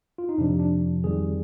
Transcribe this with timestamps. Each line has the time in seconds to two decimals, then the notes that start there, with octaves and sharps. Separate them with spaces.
0.18 F4
0.29 D#4
0.38 F2 C3 F3 D4
0.59 D4
1.03 F2 D#3 G3 G#4